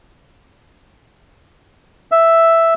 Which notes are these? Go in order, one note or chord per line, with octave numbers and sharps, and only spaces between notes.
E5